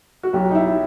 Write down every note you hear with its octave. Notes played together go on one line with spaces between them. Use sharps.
F#4
B1 G4
D#4
E4